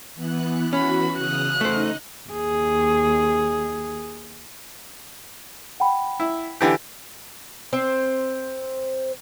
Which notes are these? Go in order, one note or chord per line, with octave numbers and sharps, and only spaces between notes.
E3 B3 F#6
E3 C#4 F#4 B5
C#3 D#6 F6 F#6
A3 D#4 C5 D#5
D#2 G#4
F#5 G5 B5
E4
D3 E3 G4
C4 C5